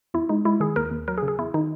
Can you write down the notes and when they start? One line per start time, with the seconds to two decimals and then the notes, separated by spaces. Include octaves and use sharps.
0.14 E2 E4
0.29 G#3 D#4
0.45 G#3 E4
0.60 D#3 G#4
0.76 D#2 A#4
0.91 D#2
1.08 F#3 A#4
1.18 G#4
1.22 C#3
1.28 G#4
1.39 E2 E4
1.54 D#3 D#4